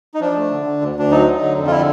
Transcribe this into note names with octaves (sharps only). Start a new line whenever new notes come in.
D#4
F3 D4
A3
D3
D3
D2
D2 D4
F#3 D#4
F#3
D3
F2
F4
D3 E4